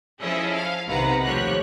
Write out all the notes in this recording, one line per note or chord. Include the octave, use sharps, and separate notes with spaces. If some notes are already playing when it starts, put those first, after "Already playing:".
F3 C#4 E4 G#4 A4 D#5
F5
B1 C3 D#3 B4 F#5 A#5
D#2 F3 A3 G4 C#5 F#6